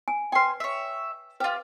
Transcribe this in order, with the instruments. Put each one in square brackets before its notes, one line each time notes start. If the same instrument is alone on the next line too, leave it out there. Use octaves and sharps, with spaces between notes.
[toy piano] G#5
[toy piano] B4 G5 [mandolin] G#5 C6
[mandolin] C#5 E5
[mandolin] F4 G4 [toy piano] B4